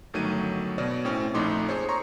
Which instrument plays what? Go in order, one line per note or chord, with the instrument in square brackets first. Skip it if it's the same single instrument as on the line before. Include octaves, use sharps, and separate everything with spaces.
[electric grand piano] G1 D#3 F#3 A3 G#6 D#7
B2 C#5 D5
A2 C4 C#4
A#1 F2 A3 D#4 C6 D6
G#4 A4 C5 C#5
C#5 A#5 C6 C#6